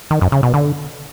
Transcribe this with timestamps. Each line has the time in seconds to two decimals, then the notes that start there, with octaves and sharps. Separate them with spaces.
0.11 D#3
0.21 F#2
0.32 C#3
0.43 B2
0.54 D3